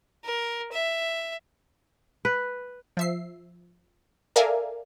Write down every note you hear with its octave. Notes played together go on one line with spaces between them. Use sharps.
A#4
E5
B4
F3 E5 C7
A4 A#4 D5 E5 F5 G#5